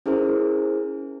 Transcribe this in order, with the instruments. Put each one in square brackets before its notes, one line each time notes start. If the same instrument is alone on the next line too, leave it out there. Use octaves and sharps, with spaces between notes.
[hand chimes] C#4 E4 G#4 A#4 C5